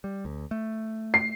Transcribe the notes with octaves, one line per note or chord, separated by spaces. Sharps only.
G3
D2
A3
C7